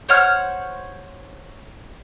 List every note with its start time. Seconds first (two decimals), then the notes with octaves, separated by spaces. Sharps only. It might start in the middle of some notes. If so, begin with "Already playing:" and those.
0.09 C5 C#5 F#5 F6